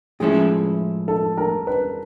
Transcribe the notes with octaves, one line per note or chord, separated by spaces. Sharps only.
A2 F3 G#3 C#4 E4 G#4
A4
A#4
B4